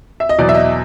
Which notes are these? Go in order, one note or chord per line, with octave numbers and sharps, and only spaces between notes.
E5
D#5
E2 B2 F#3 D5
E5
D#5